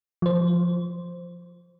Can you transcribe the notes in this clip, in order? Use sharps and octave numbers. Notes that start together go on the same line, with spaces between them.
F3 C5